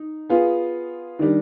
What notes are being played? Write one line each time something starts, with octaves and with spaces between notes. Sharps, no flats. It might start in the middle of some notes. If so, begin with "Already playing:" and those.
Already playing: D#4
B3 F4 G#4
D#3 G3 D4